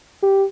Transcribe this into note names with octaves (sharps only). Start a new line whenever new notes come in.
G4